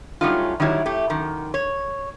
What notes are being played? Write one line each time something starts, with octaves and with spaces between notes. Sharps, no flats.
F#3 G3 A3 C#4 D#4 F4
D#3 F#3 G3 E4 C#5
A3 G4
F#2 D#3
C#5